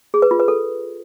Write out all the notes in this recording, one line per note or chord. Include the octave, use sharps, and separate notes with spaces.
G#4
B4
F4
B4
A4